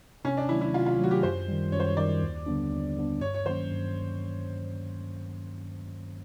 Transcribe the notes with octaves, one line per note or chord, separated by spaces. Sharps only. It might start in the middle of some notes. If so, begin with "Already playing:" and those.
C3 C#4
D4
D#3 F#3 A3 E4
E4
C3 F4
F4
D#3 F#3 A3 F#4
G4
F#2 C5
D#3 G3
F#2 C#5
C5
C#5
D#3 G3 D5
D#2
D3 G3 B3 D4
D#2
D3 G3 B3 D4
G2 C#5
C#5
D#3 F#3 A#3 C#4 C5
G2